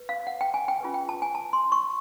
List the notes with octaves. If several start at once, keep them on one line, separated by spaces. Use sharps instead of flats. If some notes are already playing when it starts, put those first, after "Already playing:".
Already playing: B4
F5
F#5
G5
G#5
G5
C#4 F4 G#4 B4
G5
A5
G#5
A5
C6
C#6